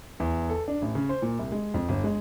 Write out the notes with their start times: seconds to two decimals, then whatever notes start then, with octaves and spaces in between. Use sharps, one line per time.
0.20 E2
0.50 A4
0.68 D4
0.82 A1
0.95 C#3
1.09 C5
1.22 A#2
1.39 C2
1.52 G#3
1.74 F2
1.89 G1
2.04 G#3